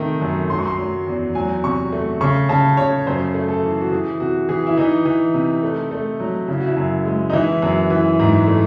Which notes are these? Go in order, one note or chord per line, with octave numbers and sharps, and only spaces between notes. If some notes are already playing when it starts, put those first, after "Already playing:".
Already playing: C3 D#3 A3
F#2
F#3 C6
C#6
C6
F#3
E2
F#3 G#5
C3 C#6
A3
C#3 C#6
C#3 A5
C#3 C#5
F#2 C5
A3
A4
E3
F#4
E3 G#4
C3 F#4
E3 G#4
E4
E3 D#4
E3
C3
A3
A3
F#3
C#3 E4
F#4
E4
F#2
G#3
D#4
E3 E4
F#2
E3
G#2
A3